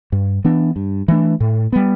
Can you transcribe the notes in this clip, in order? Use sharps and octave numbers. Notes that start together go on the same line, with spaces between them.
G2
E3 B3 D4
G2
E3 A3 D4
A2
G3 B3